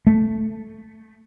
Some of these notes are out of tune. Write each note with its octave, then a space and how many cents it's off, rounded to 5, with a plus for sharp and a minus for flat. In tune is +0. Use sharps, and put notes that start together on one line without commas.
A3 +0